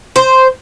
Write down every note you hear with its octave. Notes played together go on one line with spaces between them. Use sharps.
C5